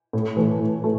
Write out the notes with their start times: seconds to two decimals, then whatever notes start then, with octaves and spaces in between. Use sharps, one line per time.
0.13 A2
0.37 E3 A3
0.60 A2
0.84 A3